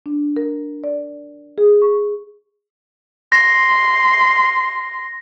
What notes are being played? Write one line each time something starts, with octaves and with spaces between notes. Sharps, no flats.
D4
A#4
D5
G#4
C#6
C6 A#6